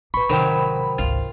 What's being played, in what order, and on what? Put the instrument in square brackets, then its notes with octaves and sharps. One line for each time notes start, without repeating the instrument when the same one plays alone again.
[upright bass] A1 [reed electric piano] B4 C#6 [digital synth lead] B5
[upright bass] A1 F3 [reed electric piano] C3 C5 G5 [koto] D#3 F#3
[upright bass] G#1 C#2 [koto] F4